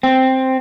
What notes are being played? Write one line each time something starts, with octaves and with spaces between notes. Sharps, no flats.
C4